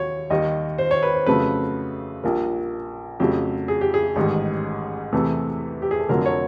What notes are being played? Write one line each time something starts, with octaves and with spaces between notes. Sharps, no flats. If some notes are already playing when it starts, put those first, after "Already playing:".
Already playing: D#2 F#3 C#5
D#2 D#3 G3 D#5
C5
C#5
B4
C5
F2 C#3 F#3 A3 B4
A#1 A#2 G3 A#4
F2 C#3 F#3 A3 G4
G#4
G4
G#4
A1 G#2 D#3 G3
E2 C3 E3 A3
G4
G#4
A4
F1 F2 D3 F#3 A3 A#4
C#5